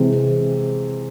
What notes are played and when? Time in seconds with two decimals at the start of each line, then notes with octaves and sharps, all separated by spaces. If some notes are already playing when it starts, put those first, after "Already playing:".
Already playing: C3 E3 G#3